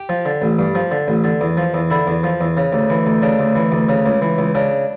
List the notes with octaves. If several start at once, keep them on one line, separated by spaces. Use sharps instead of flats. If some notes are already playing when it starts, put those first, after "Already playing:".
Already playing: G4
F3
D3
A1
G2
F3
D3
A1
D3
E2
F3
E2
D3 E4
E2
F3
E2
C#3
D2
E3
D2
C#3 D4
D2
E3
D2
C#3
C#2
E3
C#2
C#3 D4